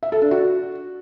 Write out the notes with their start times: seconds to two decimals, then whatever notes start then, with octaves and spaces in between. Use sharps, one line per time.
0.03 E5
0.12 A4
0.22 D4
0.31 F#4